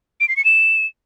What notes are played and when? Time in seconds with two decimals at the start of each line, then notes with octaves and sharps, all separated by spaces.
0.20 D7
0.29 C7
0.37 C#7
0.45 E7